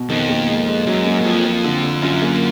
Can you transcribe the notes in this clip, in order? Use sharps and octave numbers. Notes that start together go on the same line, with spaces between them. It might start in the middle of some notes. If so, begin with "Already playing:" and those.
Already playing: B2
F2 D#3
A#3
G#3
G#3
F#2 F#3
A#3
F#2
F2 F3
F3
D3
D3
F#2 F4
A#3